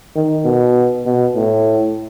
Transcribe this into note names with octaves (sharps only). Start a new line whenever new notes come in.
D#3
B2
B2
A2